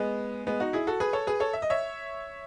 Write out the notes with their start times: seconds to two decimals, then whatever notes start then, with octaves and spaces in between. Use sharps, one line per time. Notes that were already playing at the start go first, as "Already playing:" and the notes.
Already playing: G#3 B3
0.47 G#3 B3
0.60 D#4 F#4
0.73 E4 G#4
0.87 F#4 A4
1.00 G#4 B4
1.13 A4 C#5
1.27 G#4 B4
1.40 A4 C#5
1.53 E5
1.62 D#5
1.70 C#5 E5